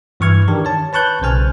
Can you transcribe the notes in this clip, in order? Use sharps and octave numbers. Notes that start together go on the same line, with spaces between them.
G2 E3 E4 C#6 F6 G#6
D#3 D4 G4 A#4
C#5 A5
B4 A5 C#6 F#6 G6
B1 C#3 C5 G#5 F6